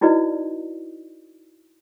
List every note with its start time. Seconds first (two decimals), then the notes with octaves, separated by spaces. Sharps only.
0.01 D#4 E4 F#4 B4 D5 D#5